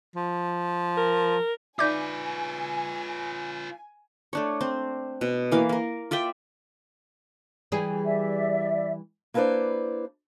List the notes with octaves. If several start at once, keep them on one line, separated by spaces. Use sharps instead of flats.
F3
A#4
D#4 F4 B4 D5 E5 G#5 D6 G6
A3 D4 C#5
C4 C5
B2
E3 A#3 F5
A#3 A#4
F4 D5 E5 G5
E3 G3 G#4
D5 E5
A#3 D4 E4 B4 C5 D5